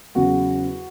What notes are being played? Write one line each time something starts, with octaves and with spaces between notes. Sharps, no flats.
E2 C#3 F#3 F#4